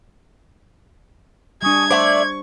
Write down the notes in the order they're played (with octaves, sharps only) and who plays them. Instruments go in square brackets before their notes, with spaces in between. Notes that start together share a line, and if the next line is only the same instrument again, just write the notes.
[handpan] G3 D4 [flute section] G#5 C#6 D#6 [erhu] G#6
[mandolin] A3 D5 [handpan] C5 [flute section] C#6